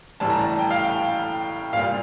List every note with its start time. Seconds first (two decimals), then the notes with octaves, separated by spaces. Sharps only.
0.20 A2 E3 G3 A5
0.30 A#5
0.39 A5
0.59 G5
0.71 F5
0.83 G5
1.73 A#2 G3 F5